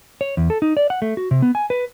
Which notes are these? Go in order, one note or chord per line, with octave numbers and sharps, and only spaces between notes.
C#5
E2
A4
D#4
D5
F#5
A3
F#4
C3
B3
G#5
B4